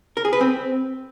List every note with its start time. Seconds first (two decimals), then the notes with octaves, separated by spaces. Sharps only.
0.17 A#4
0.25 G#4
0.33 B4
0.41 C4